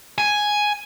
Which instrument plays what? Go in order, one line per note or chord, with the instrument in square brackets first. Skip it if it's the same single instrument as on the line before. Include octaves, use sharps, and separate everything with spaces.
[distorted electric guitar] G#5